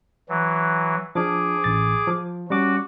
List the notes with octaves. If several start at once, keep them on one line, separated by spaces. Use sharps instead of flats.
E3 F#3
F3 D4 G#4 D6
A1 A6
F3
G3 C#4 F#4 D6